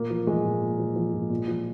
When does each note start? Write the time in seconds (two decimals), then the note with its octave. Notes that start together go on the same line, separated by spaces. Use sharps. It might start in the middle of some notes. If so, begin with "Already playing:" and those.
Already playing: A#2 A#3
0.10 F3
0.27 F3 G#3
0.45 A#2
0.61 A#2
0.79 F3
0.96 F3
1.13 A#2
1.30 A#2
1.48 F3